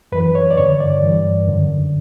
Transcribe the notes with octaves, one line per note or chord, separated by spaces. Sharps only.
F#2 E3 B4
C#5
D5
G2 D3 C#5
D5
G2 E3
F#2 D3